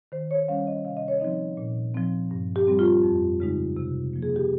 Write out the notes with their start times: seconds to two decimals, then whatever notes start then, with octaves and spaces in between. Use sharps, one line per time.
0.12 D#3 C5
0.31 C#5
0.48 G3 C#4 F5
0.67 D#5
0.85 C3 F5
0.97 D#5
1.08 C#5
1.20 F3 C4 D#4 D#5
1.57 A#2
1.95 F3 C4
2.31 G2
2.56 G4
2.67 G3 C4
2.79 F4
3.03 F2
3.40 C#3 G#3 D#4
3.77 C3
4.13 F3 A#3
4.22 G#4
4.36 G4